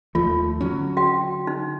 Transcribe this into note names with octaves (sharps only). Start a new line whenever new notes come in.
D#2 F3 A3 F4
D3 F#3 C#4
F#4 G5
D#4